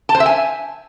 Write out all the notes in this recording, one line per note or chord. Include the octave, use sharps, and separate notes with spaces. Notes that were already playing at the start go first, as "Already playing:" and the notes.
A5
C5
E5
G#5